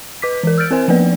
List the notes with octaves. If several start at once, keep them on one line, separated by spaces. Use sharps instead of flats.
B4 D6 B6
E3 A#4
E6 F6 G6 A6 D7
C4 A#4 C5 G#5
F3 A#3 B3 B4 D5